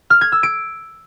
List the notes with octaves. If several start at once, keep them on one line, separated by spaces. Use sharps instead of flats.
F6
G#6
E6
D7